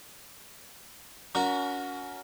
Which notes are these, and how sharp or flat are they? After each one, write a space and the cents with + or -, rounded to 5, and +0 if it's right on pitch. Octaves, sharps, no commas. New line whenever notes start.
C#4 +30 F#4 -20 A#4 +0